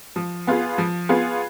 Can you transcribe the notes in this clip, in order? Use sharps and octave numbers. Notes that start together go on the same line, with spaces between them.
F3
B3 F4 G#4
F3
B3 F4 G#4